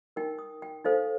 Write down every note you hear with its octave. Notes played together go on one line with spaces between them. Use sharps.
D#4 A#4 G5
D#6
G5
D#4 A4 C5 F5